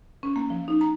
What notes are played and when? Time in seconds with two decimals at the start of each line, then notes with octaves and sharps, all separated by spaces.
0.23 C#4
0.36 A#3
0.50 F3
0.68 D#4
0.81 A#5